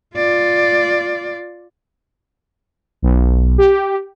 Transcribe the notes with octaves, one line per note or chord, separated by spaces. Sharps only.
F4 D5
B1
G4